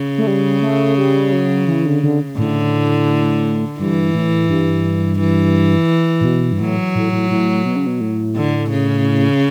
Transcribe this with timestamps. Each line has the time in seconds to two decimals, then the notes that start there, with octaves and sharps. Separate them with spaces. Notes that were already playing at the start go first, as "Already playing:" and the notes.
Already playing: C#3
0.18 A3
0.27 G3
0.62 A3
0.98 G3
1.32 F#3
1.67 E3
1.86 D3
2.03 D3
2.38 A2 D3
3.79 G2 E3
4.14 A2
4.49 G2
5.19 E3
6.21 A2
6.25 B2
6.52 G2
6.60 A2 F#3
6.95 A2
7.13 A2
7.31 A2
7.65 B2
7.76 C#3
7.87 B2
8.01 A2
8.36 D3
8.71 C#3